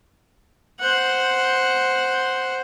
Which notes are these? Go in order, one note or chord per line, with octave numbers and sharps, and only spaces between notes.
C5 F#5